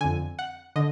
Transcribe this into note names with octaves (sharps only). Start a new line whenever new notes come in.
F2 D3 G#5
F#5
D3 D#5